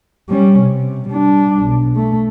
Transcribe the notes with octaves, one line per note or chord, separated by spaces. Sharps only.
G3 C#4
C3
G3 D4
B1
A3